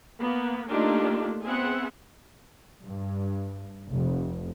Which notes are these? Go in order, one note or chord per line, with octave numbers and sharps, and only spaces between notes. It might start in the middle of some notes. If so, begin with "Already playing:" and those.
A#3 B3
A3 A#3 D4 D#4 F4 G4
B3 C4 G#4 E5 F#5
G2
F1